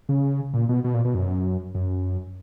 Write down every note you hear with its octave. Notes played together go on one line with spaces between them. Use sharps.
C#3
A#2
B2
B2
A#2
B2
F#2
F#2